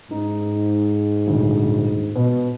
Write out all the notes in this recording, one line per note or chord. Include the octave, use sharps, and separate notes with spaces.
G#2 D#4
D#1 D2
B2